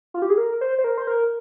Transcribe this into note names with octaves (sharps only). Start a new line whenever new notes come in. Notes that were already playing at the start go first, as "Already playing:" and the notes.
F4
G4
G#4
A#4
C5
C5
A#4
C5
A#4